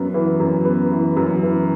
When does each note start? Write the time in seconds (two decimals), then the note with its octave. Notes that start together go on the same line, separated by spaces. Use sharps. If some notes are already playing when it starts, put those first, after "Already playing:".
Already playing: F#2 B3
0.14 E3
0.40 F#2
0.65 B3
0.91 E3
1.17 F#2
1.43 E3